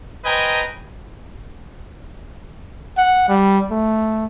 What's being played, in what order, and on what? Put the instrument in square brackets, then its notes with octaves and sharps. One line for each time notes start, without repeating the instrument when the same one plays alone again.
[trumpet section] B4 C5 D#5 G5 G#5 A#5
[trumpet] F#5
G3
A3